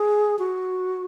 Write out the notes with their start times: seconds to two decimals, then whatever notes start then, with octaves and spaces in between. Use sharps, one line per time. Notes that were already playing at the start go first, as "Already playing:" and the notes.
Already playing: G#4
0.39 F#4